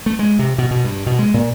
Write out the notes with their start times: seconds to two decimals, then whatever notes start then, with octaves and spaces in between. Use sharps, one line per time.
0.06 A3
0.19 G#3
0.39 C3
0.58 B2
0.71 B2
0.84 G2
1.06 B2
1.19 G#3
1.34 A#2